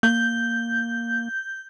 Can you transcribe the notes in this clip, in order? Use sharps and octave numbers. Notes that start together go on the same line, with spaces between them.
A#3 G6